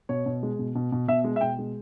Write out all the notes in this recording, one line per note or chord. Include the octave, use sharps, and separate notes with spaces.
B2 C#5
B2
G#3
B2
B2
B2
B2 E5
G#3
E5
B2 G5
G#3